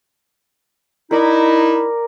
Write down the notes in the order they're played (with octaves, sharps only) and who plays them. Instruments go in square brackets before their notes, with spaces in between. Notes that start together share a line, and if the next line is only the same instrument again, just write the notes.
[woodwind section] D#4 E4 [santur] A#4 D5